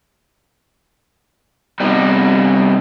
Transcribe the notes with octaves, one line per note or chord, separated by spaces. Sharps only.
C3 G3 B3 D#4